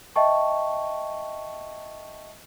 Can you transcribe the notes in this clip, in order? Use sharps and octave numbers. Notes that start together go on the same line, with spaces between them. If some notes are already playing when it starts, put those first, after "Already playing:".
D#5 E5 G5 A5 C#6